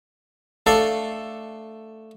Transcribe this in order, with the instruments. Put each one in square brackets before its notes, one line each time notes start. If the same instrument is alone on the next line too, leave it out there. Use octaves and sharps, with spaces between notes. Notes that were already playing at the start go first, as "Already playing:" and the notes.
[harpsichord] A3 D4 A4 D5 F5 C#6